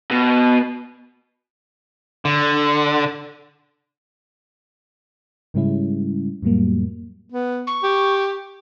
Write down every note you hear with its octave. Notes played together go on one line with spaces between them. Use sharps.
B2
D3
G#2 C#3 G3 G#3 C#4 E4
F2 A2 F#3 G3 A#3
B3
C#6
G4